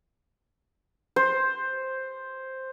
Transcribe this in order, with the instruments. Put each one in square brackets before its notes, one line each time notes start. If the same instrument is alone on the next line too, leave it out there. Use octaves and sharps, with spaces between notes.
[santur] C5